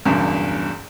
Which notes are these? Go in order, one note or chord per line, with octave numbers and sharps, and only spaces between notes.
F#1 E2 G2 B2